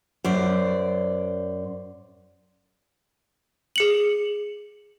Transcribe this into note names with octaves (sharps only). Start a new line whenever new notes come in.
F#2 C5 D5
G#4 C#7 F#7